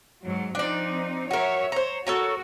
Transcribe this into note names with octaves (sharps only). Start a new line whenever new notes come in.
G#2 F#3
F3 C4 D4 D#4 D5
F#4 A#4 C#5 E5
C5 C#5 A#5
F#4 A4 A#4 C#5 A#5